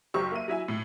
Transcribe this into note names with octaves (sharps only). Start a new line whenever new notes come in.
F#1 F#3 G4 C5 C#6 E6
A#3 E5 D#7
F#3 E4 E5 G#5
A2